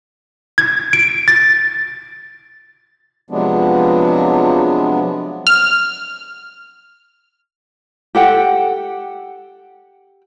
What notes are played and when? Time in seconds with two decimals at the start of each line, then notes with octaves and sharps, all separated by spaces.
0.58 G#6
0.93 D7
1.28 A6
3.30 C3 F3 F#3 G#3 B3 D4
5.47 F6
8.15 G4 A4 F#5 G5